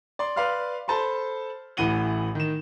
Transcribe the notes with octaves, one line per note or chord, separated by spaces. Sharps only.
D5 C6
B4 D5 F5 C6 F6
A4 C5 A5 B5 C6
A1 A2 E3 F#5 D#7 G7
D#3 E7